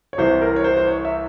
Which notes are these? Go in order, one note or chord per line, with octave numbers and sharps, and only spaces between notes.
C#5
C2 C3 E3 C5
A#4
C#5
C5
C5
C#5
E5